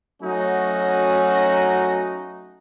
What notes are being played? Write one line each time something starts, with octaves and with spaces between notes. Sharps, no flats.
F#3 A3 C#4 D#4 F#4